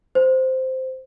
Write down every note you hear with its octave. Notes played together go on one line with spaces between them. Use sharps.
C5